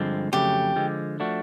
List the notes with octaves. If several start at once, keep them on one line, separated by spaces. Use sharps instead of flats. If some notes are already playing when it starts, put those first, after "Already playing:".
Already playing: G2 D3 F3 G#3 C4
F2 C#3 F#3 A3 C#4 G4
D3 F3 G#3
F3 A3 D4 F#4